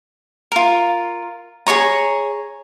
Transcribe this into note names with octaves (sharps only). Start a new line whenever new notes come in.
F4 A#4
G#4 C5 C#5 A#5